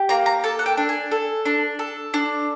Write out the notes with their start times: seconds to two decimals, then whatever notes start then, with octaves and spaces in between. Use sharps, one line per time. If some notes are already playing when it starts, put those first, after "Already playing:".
Already playing: G4
0.09 A#3 A#5
0.26 A#5
0.44 A4 A5
0.59 F#5
0.66 G5
0.77 D4
0.89 G#5
1.11 A4
1.46 D4
1.79 A4
2.14 D4